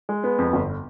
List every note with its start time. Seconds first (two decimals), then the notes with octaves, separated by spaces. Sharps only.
0.09 G#3
0.24 B3
0.38 F2
0.53 G1